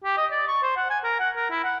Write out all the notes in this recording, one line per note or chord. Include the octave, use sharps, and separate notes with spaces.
G4
D#5
D5
C#6
C5
F#5
G#5
A#4
F#5
A#4
E4
F#5